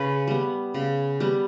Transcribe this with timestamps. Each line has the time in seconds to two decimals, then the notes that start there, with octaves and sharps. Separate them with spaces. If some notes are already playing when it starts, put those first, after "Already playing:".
Already playing: C#3 B4
0.28 G3 B3
0.74 C#3
1.20 G3 B3